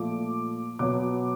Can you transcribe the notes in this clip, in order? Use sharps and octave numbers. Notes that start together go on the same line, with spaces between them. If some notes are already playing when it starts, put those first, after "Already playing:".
Already playing: A#2 F3 A3 D6
B2 F#3 B3 D6